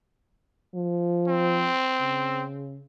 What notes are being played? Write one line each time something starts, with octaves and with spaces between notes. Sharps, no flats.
F3
C4
C#3